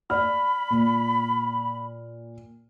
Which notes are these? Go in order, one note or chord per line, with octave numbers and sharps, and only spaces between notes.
D5 B5 F6
A#2